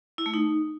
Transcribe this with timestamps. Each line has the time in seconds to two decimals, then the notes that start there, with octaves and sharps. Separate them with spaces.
0.18 E4
0.26 A3
0.34 D#4